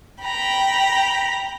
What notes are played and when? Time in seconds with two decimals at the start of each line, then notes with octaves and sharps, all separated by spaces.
0.24 G5 A#5 B5